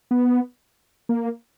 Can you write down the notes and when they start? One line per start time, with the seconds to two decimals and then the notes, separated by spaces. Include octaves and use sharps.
0.11 B3
1.09 A#3